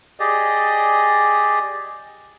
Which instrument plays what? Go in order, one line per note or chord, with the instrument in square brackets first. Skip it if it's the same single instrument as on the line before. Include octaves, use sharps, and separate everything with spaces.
[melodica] G4 G#4 D5 D#5